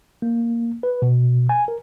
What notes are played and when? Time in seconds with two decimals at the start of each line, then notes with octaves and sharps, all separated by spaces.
0.22 A#3
0.83 B4
1.02 B2
1.49 G#5
1.68 A#4